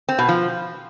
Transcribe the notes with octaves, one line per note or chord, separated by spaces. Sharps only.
C4
B2
F3